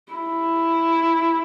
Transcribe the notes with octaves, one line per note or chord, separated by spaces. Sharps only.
E4